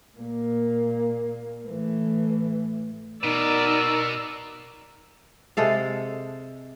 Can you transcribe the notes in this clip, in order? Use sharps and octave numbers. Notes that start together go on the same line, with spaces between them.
A#2 A#3
A2 E3
B2 D#4 A#4 D5 E6
C3 G#3 A4 F5